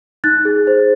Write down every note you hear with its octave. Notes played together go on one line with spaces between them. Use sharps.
D#4 F#6 A6
G#4
C5